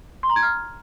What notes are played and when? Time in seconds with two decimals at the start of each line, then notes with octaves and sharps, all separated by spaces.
0.23 C6
0.30 A#5
0.36 G#6
0.42 F6